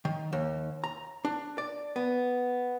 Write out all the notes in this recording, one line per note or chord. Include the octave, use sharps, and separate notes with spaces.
D#3
D#2
A#5
D4
D5
B3